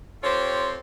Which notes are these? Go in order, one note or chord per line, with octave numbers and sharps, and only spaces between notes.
C4 F4 G4 A4 C5 C#5